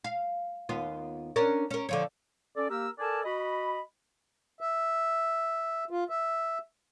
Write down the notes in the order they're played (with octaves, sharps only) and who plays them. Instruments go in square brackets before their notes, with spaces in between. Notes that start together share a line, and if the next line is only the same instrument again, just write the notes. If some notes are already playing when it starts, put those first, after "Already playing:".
[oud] F5
D#2 B3 F4
C#4 D4 A#4
C#4 A#4
D3 F3 C#5
[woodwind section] C#4 A4 D5
A#3 G4 A#4 E6
A4 A#4 D5 G#5 A5
F#4 D#5 B5
[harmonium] E5
F4
E5